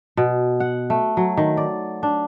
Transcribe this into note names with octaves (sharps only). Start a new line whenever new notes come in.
B2
F#5
A3
F#3
D#3
D5
D4